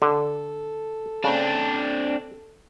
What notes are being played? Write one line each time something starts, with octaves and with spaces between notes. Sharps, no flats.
D3 A4
C#3 C4 D4